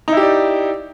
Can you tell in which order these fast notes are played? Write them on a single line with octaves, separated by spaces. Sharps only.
D#4 E4 G4 D5